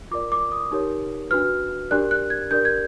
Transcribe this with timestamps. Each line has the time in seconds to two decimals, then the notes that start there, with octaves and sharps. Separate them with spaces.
0.11 F4 A#4 D5 D6
0.32 D6
0.52 D#6
0.71 D#4 G4 A#4 C#5
1.31 D4 F#4 B4 F6
1.91 D4 G4 A#4 D5 F#6
2.11 F#6
2.30 G#6
2.51 D4 G4 A#4 D5 G6
2.65 G#6